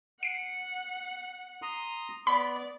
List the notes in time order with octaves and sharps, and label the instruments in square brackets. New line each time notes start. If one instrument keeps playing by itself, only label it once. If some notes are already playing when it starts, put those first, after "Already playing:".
[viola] F#5 [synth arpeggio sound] C7 D7
[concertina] A#5 C6 D#6
[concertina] B3 [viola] D5 [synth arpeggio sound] B5